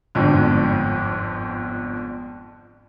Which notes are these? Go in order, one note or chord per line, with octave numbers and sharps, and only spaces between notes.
G1 F2 G#2 D3